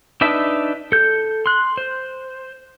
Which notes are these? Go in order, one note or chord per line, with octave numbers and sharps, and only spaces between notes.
D4 D#4 B4 E5 A5
A4 G6
C6 F#6
C5